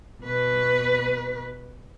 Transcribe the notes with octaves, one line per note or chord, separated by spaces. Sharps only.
B2 B4